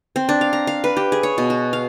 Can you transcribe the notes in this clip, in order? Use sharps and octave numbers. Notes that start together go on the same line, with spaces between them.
C4
D4
F5
A#5
F5
B4
G4
G#4
C#5
B2
F#4
F5